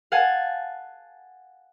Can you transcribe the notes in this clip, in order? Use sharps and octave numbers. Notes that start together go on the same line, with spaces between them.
F5 F#5 G#5 A5